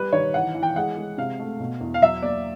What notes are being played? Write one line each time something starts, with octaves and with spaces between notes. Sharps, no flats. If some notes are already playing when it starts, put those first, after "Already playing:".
Already playing: G3 B4
D#3 C#5
E3 F#5
E3
G5
G#3 F#5
G#3
C3 F5
A3
B2
E2
F5
F#3 E5
A#3 D5